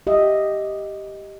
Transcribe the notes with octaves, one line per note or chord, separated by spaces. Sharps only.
G4 D#5 E5